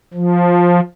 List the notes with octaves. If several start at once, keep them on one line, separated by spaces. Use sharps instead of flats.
F3